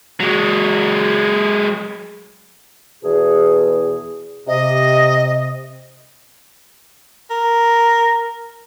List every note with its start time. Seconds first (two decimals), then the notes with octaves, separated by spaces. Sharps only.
0.20 F#3 G#3
3.03 E2 B2 G#4
4.47 C3 D#5
7.30 A#4